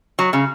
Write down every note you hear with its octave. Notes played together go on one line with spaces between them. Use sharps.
F#3
C#3